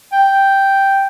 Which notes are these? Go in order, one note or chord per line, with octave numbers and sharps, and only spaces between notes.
G5